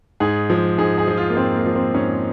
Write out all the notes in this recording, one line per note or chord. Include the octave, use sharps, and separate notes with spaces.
G#2 G#4
F3
G#2 G#4
G#4
F3
F4
A#3
G#2 C4
A#3
F3
C4
G#2 C#4